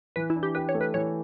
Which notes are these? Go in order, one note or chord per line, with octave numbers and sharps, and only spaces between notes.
E3 B4
E4
D4
G4
G4 B4
C#5
A3
B4
E3 C#5